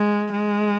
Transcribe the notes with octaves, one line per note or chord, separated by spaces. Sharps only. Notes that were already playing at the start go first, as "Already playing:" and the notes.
Already playing: G#3
G#3